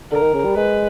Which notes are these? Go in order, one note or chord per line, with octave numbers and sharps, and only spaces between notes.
D3 A#4
D#3
C#3
G3
G#3 B4